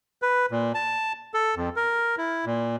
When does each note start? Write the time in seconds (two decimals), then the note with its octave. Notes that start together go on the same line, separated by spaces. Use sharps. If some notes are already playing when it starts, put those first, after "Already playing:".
0.22 B4
0.51 A#2
0.74 A5
1.34 A4
1.56 F2
1.76 A#4
2.18 E4
2.46 A#2